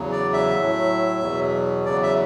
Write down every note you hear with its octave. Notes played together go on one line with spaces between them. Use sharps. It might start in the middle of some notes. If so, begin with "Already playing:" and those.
Already playing: E2 C#3 F#3
D5
E5
A2 F#3
E2 B2 F#3
E2 C#3 F#3 D5
E5